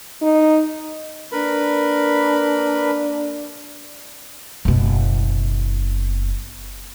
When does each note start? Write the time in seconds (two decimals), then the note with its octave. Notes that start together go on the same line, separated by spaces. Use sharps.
0.22 D#4
1.32 A#3 D4 A#4 B4 B5
4.65 F#1 B2